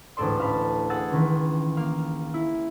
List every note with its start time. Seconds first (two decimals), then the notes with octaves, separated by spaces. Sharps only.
0.17 A1 D2 G#2 A4 D5 C6
0.39 A4 F5 A5 B5
0.90 G#4 F#5 E6 A6
1.10 C#2 D#3 E3
1.77 A#3 F5
2.34 E4